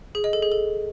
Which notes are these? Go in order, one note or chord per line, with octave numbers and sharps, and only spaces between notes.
G#4
D#5
A4
G#4
A4